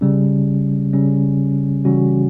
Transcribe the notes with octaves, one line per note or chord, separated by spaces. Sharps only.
C#3 G3 C#4
C#3 G3 C#4
C#3 E3 G3 C#4 F#4